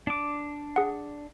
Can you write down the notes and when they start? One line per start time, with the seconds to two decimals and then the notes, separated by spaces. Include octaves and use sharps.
0.07 D4 D6
0.76 G#4 F#5